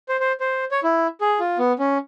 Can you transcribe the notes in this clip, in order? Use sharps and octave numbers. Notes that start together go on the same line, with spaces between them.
C5
C5
C5
C#5
E4
G#4
F4
B3
C#4